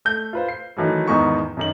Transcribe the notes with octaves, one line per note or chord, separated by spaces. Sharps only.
A3 G6
F4 B4 C5
C7
D#3 E3 F#3 A3
E2 G#2 D#3 B3 G#5 C#6
F#2 D#3 F#7